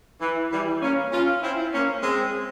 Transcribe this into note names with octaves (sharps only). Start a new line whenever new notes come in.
E3
E3 G3
A#3 C#4
C#4 F4
C4 E4
A#3 C#4
G#3 C4